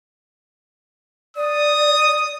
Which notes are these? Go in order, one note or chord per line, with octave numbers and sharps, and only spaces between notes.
D5 D#6